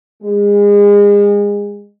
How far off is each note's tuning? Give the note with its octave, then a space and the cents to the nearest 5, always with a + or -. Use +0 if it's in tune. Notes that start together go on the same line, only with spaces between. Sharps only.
G#3 -30